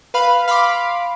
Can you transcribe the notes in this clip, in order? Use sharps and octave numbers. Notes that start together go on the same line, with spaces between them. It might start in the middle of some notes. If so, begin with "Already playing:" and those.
B4 F5 B5
F5 B5 C6 D6